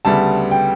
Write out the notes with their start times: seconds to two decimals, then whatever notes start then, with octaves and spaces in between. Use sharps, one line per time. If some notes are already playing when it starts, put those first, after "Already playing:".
0.05 D2 C#3 G3 B3 A5
0.51 G5